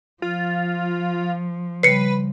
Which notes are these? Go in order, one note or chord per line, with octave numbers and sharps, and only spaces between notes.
F3 F4
C#3 G3 B4 C7 C#7